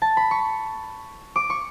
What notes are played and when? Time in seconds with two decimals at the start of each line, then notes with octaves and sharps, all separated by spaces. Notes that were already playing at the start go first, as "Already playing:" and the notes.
0.02 A5
0.17 B5
0.31 C#6
1.36 D6
1.50 C#6